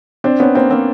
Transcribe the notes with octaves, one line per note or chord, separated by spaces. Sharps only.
C4 D4
B3 C#4
A#3 C4
A#3 C4